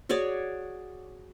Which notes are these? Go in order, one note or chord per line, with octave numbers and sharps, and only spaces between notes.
F#4 G#4 C#5 D5